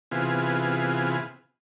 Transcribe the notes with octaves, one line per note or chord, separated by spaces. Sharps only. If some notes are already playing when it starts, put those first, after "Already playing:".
C3 E3 B3 F4 G#4